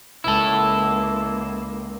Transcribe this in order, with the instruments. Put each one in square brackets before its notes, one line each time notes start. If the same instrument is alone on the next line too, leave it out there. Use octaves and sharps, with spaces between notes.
[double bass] C#2 A#3 [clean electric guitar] E4 A4